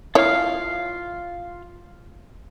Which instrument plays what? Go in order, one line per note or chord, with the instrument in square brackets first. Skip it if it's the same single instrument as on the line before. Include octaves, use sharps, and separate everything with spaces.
[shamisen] E4 C#5 [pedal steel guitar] F4 F5